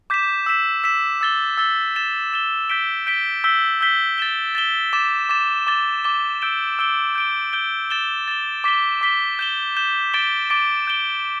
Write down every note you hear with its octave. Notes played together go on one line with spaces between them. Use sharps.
D6 G6 B6 E7
E6 B6 E7
E6 B6 E7
E6 A6 G7
E6 A6 G7
A6 E7 G7
A6 E7 G7
G6 B6 D7 G7
G6 B6 D7 G7
E6 G6 B6 G7
E6 G6 B6 G7
A6 E7 G7
A6 E7 G7
D6 A6 E7
D6 A6 E7
D6 A6 G7
D6 A6 G7
E6 G6 D7 G7
E6 G6 D7 G7
G6 D7 G7
G6 D7 G7
A6 E7 G7
A6 E7 G7
D6 B6 G7
D6 B6 G7
G6 E7 G7
G6 E7 G7
D6 A6 D7 G7
D6 A6 D7 G7
G6 D7 G7